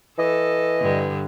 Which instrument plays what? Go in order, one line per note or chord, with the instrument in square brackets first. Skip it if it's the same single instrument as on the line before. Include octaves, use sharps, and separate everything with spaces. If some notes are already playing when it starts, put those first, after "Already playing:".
[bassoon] E3 [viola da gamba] A4 [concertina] D#5
[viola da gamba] G2 D3